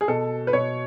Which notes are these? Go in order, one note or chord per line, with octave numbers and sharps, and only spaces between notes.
G#4
B2 A4
B4
B2 C#5